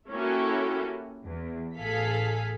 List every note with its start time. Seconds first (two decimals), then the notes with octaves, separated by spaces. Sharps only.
0.12 A#3 C#4 E4 F#4 G4 A4
1.24 E2
1.77 A1 G#4 A4 F5 B6